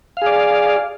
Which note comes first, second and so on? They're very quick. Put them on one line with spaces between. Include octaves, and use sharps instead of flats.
F5 G#4 D5